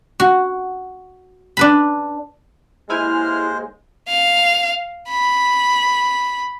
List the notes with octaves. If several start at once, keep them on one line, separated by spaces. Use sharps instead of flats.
F#4
D4 B4 B5
D#2 G#3 E4 C5 G#5 F6
F5
B5